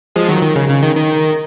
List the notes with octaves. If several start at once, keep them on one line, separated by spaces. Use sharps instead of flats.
F3 G#3
D#3 F#3
D#3
C#3
C#3
D#3
D#3